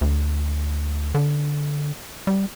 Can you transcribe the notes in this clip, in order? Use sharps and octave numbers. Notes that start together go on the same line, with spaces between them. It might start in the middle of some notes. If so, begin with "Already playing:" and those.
D2
D3
G3